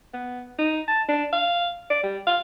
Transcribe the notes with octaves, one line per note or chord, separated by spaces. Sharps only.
B3
D#4
A5
D4
F5
D5
G3
F5